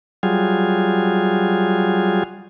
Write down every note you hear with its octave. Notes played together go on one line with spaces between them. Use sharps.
F#3 G3 F4 G#4